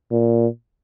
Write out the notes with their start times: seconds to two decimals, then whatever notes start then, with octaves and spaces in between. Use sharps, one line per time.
0.11 A#2